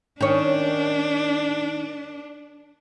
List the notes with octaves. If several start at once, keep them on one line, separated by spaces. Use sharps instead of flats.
D#3 C#4 D4